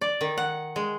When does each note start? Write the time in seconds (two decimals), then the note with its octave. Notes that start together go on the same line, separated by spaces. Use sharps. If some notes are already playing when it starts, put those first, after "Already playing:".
0.01 D5
0.21 D#3
0.38 F#5
0.76 G#3